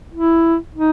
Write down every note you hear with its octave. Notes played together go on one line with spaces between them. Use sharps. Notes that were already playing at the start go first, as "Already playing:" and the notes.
E4
D#4